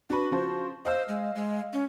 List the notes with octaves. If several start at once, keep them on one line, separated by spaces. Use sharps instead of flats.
D4 F#4 B4
C#3 F3 C5
C5 D#5 F5 E6
G#3
G#3
C#4